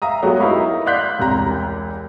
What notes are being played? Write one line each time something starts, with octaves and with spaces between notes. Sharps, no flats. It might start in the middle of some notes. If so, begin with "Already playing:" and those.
E5 F5 A#5 D#6
F#3 G#3 A3 B3 F#4 G4
D#4 E4 A#4 F5 B5 C#6
D5 F5 C6 F#6 G6 B6
E1 C2 G4 A#5